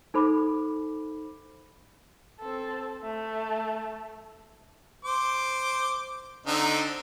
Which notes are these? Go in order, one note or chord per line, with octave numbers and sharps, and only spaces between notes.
D#4 A4 C5 B5 D6
C4 A4
A3
C5 D6
D3 C4 D#4